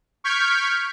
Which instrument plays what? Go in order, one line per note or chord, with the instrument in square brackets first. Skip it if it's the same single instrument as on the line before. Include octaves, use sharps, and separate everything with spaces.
[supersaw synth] C#6 F6 G6 G#6 B6 D7